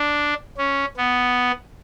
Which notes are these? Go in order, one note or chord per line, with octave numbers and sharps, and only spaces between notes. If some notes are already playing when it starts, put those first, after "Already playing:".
Already playing: D4
C#4
B3